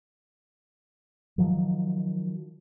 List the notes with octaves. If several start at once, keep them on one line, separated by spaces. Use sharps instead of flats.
D#3 F3 F#3